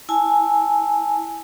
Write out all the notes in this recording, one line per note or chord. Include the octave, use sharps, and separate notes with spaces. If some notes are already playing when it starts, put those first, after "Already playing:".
E4 G#5 A5